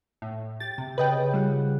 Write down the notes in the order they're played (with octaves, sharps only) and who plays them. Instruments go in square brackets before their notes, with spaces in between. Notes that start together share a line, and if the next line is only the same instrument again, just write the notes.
[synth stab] A2
[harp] G4 [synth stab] A6
[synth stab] C3
[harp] C#3 C4 G6 [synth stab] B4 D#5 G5
[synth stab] G3 [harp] F4 F#5